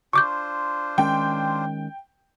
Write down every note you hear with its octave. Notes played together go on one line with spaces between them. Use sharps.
D4 F4 C5 C#6 D6 G6
D#3 G#3 C#4 G5